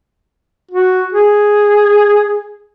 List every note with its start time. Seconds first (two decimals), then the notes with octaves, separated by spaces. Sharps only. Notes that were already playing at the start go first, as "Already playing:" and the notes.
0.71 F#4
1.13 G#4